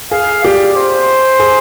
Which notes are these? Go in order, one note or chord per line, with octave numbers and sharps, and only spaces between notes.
G#4 F5
G4 D5
C5
G#4